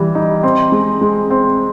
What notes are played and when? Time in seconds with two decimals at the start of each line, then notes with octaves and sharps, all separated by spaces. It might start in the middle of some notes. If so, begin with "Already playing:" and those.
Already playing: E3 G3
0.15 D#4
0.43 C4
0.72 G#3
1.01 G#3
1.30 C4